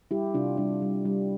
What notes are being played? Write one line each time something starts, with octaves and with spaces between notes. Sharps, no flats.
G3 E4 G4
C3 D4 F4
G3 D4
G3
G3